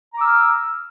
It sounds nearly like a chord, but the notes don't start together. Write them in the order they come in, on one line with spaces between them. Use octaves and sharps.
A#5 D6 E6 F6